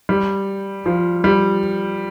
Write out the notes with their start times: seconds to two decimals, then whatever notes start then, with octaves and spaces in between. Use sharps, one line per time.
0.09 G3
0.86 F3
1.24 G3